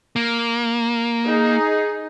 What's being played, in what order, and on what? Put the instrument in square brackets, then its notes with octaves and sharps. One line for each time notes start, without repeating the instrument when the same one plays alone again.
[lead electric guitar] A#3
[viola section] D#4 G#4